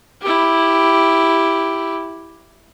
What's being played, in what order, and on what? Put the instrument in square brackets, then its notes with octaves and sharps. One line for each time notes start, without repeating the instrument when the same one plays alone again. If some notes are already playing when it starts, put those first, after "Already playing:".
[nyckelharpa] E4 G4